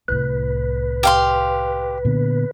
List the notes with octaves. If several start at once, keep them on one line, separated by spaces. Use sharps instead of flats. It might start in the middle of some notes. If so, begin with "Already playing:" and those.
C2 A2 B4
G4 F5 C6
A#2 D3 B3